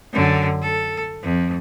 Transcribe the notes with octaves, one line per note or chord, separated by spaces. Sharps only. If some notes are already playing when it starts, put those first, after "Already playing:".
F#2 D3
A4
F2